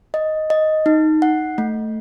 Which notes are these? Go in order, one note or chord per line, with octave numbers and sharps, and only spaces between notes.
D#5
D#5
D#4
F#5
A3